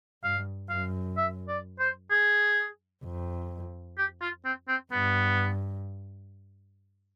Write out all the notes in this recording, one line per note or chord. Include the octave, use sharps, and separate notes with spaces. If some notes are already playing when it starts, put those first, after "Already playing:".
G2 F5
F#2 F5
E5
D5
C5
G#4
F2
G4
F4
C4
C4
G2 B3